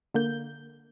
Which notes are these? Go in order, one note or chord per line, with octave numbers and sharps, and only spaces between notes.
D3 A#3 G6